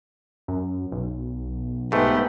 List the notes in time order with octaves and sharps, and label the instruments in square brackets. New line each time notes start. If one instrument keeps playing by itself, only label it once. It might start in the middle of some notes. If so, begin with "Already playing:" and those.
[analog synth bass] F#2
B1
[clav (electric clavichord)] G#2 A3 [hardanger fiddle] B3 G4